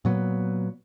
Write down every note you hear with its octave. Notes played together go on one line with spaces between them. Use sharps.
A#2 F#3 B3